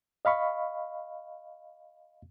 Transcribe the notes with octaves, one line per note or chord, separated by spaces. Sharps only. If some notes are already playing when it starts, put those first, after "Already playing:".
D#5 F5 B5 C#6